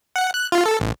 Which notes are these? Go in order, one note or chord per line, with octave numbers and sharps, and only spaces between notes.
F#5
F#6
F4
A4
A1